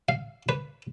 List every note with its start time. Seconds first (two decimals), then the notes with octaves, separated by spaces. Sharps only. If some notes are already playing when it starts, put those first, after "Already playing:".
0.09 F5
0.49 B4